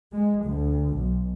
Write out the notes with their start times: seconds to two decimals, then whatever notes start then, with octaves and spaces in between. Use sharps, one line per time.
0.12 G#3
0.45 D2
0.96 B1